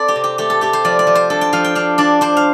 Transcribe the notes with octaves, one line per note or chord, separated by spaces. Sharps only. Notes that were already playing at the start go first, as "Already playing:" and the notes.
Already playing: C4 A4 C5 D5
G4
C3
G4
A3 G4
A4
A3 G4
C5
F3 D5
D5
F3
C5
D4 A4
G5
F3 F5
G5
D4 F5
D4 D5
D4 C5
F5